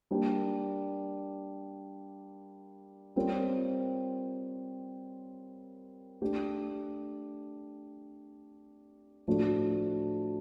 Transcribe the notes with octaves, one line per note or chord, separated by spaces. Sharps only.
G3 A#3 D4 G4
G3 C4 F4 A#4 C#5
A3 D4 G4
A2 F3 A3 D4 F#4